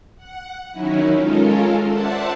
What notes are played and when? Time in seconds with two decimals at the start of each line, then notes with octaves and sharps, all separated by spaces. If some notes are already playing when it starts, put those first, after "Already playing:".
0.16 F#5
0.71 D#3 F#3 C#4 D#4 E4
1.16 G#3 C#4 F4 A4 A#4
1.85 C5 D5 E5 F#5 A5 C6